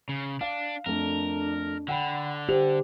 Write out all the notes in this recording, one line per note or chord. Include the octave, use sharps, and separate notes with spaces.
C#3
D4 F5
F2 A3 D4 A#4
D3 F#5 G5 B5
G4 C5 F7